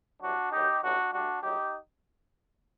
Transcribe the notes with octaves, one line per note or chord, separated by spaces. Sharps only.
C2 C3 F#3 D4 F#4
D#2 D3 F#3 D#4 G4
A1 G2 F#3 D4 F#4
D2 D3 G3 D4 F#4
A#1 A2 F#3 D#4 G4